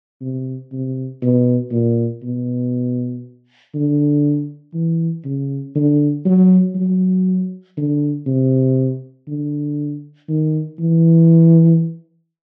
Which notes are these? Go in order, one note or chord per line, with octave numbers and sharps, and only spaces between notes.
C3
C3
B2
A#2
B2
D3
E3
C#3
D3
F#3
F#3
D3
C3
D3
D#3
E3